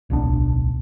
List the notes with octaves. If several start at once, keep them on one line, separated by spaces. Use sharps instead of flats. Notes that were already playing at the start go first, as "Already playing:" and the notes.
D1 B1 B3 D4